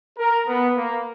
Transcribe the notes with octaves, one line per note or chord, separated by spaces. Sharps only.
A#4
B3
A#3